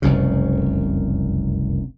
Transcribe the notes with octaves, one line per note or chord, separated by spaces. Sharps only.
F1 C2 F#2 C#3